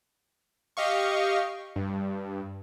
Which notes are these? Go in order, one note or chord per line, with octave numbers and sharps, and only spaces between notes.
G4 D#5 F5 C#6
G2